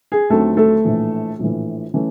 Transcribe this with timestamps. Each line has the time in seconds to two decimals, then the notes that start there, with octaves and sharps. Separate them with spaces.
0.12 G#4
0.30 D#2 D3 F#3 A3 C4 A4
0.57 A3 A4
0.85 A#1 A2 E3
1.39 A#1 A2 E3
1.94 E3 A3 C#4